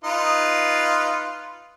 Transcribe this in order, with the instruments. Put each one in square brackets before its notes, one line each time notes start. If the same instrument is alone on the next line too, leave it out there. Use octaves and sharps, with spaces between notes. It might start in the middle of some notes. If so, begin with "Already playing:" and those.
[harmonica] D#4 F4 B4